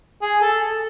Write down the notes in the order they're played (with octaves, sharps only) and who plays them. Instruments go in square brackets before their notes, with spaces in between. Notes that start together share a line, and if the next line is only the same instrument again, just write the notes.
[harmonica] G#4
A4